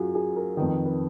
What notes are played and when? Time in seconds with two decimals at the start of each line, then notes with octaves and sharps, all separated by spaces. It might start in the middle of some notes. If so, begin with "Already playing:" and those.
Already playing: F#2 F4 F#4 G#4
0.15 G#4
0.36 A#4
0.57 F2 D#3 B4
0.71 B4
0.85 B4